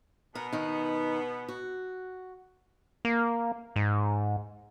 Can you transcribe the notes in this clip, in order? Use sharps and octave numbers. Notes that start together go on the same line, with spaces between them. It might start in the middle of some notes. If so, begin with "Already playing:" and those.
B2 B3 A#4
D#3 D#4
F#4
A#3
G#2